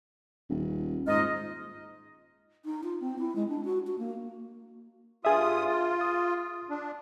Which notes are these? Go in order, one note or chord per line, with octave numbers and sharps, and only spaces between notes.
D#1
G#2 D#4 F4 D#5
D#4
F4
C4
E4
G#3
D4
F#4
F#4
A#3
G2 F4 G#4 E5 D#6
F4
D#6
D4